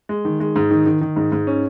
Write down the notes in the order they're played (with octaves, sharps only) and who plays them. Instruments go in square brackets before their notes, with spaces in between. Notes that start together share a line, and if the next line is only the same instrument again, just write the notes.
[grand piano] G#3
D#3
G#3
G#2
D#3
D#3
D#3
G#2
G#2
C#4